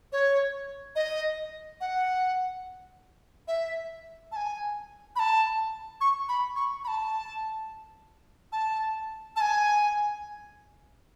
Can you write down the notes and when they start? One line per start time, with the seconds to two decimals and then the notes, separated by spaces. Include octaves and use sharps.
0.12 C#5
0.96 D#5
1.81 F#5
3.48 E5
4.32 A5
4.36 G#5
5.16 B5
5.19 A5
6.01 C#6
6.29 B5
6.56 C#6
6.84 B5
6.88 A5
8.52 A5
9.36 A5
9.41 G#5